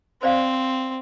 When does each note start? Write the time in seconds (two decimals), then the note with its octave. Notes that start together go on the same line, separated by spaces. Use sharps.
0.23 C4 C5 D5 F5